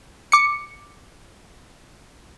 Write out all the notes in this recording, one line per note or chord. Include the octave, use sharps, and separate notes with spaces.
D6 C#7